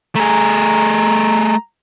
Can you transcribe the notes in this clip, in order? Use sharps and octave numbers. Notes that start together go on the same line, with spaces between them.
A3 G#4 A#5